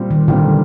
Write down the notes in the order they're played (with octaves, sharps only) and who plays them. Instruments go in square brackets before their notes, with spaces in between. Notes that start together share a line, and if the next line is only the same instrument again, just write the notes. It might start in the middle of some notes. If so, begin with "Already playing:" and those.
Already playing: [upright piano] A#2 G3 C4
[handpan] D#3
[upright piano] A#2 G3 C4 [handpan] D3